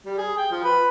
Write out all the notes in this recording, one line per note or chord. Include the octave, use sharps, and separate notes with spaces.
G3
G#4
G5
F3
B4